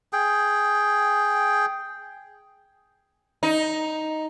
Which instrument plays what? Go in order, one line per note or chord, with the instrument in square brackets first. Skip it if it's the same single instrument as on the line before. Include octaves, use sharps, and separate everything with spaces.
[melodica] G#4 G5
[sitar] D#4